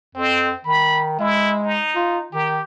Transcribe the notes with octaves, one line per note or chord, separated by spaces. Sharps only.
F2 C4
D#3 B5
G#3 E4
D#4
F4
D#3 G4